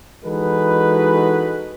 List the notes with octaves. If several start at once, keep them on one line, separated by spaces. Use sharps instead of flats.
E3 G#3 D#4 F#4 A4 B4